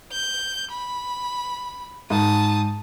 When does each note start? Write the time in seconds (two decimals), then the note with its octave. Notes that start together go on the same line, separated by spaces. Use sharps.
0.12 G6
0.71 B5
2.10 G#2 A5 D#6